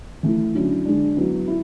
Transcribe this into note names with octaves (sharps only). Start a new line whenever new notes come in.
E3 A3 E4
D3 F#3 C#4 E4
D3 G#3 D4
F#3 B3 E4
E4